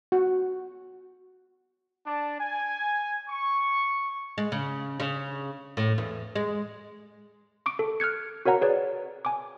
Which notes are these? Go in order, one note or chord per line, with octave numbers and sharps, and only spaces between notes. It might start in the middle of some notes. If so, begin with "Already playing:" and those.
F#4
D4 D5 A5
G#5
C#6
G#3
C#3
C#3
A2
E2
G#3
C#6 D6 D7
A4
F6 F#6 G#6 C#7
F#4 A#4 C#5 F#5 A#5
G#4 B4 C#5 D5
G#5 D6